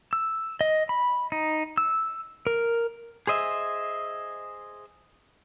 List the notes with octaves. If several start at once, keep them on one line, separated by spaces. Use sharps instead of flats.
E6
D#5
B5
D#4
E6
A#4
G#4 C5 D#5 E5